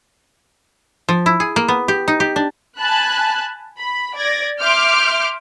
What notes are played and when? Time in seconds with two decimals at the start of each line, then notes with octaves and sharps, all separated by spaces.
1.09 F3
1.26 E4
1.40 G#4
1.56 A#3
1.68 B3
1.88 G4
2.08 D#4
2.20 G4
2.36 D4
2.77 G#5 A5 B5 F#6
3.78 B5
4.16 D5 G#6 A#6
4.60 E5 C6 D6 F6 G6